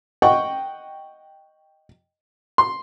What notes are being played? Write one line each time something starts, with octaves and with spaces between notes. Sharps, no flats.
D#5 F#5 G5 C#6
C6